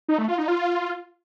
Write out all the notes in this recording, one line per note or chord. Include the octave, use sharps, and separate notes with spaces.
D#4
A3
F4
D#4
F4